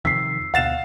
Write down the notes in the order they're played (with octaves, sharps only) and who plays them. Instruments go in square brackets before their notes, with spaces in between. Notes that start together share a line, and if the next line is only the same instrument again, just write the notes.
[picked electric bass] F2 C3 D#3 [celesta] E6 C7 [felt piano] B6
[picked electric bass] D2 B2 [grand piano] F5 A6 E7 [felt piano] F#5